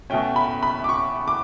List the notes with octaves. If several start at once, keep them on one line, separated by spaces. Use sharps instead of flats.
B2 A3 C#4 G5
B5
B5
D6
C#6
D6